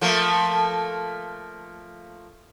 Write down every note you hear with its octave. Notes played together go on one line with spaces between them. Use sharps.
F3 A3 A#3